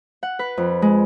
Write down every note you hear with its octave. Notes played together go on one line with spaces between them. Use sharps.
F#5
B4
F2
G#3